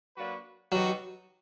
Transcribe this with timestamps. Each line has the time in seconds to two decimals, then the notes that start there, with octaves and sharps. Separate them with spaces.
0.15 F#3 A#3 D4 F#4 B4
0.72 F#3 G3 B3 D#4 F#4